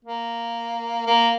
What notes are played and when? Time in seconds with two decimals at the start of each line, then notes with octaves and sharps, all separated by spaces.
0.05 A#3
1.07 A#3